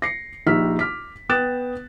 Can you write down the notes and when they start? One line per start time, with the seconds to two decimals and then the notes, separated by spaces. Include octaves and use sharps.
0.02 A#6 C7 C#7
0.46 A#1 D#4 G4 E6 F6 B6
0.79 D6 F6 B6
1.29 B3 G5 D#6 F#6 A6 E7